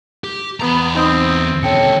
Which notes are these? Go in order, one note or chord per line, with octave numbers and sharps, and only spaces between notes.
G4
E2 B3 A#5
C4 D#4 D#5 D#6
B2 D3 A4 C#5 G5 C#7